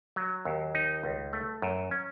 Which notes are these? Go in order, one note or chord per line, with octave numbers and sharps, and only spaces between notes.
F#3
D#2
D#4
C#2
A3
F#2
C#4